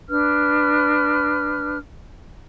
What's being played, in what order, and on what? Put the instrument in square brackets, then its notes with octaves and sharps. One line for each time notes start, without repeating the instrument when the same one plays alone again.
[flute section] D4 B4 F6